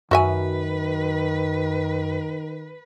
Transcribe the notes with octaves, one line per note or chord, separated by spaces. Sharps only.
F#2 D#3 F#4 B4 E5 G#5